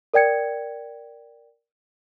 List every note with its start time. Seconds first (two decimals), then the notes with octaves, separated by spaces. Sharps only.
0.14 A#4 D5 G5 G#6 C#7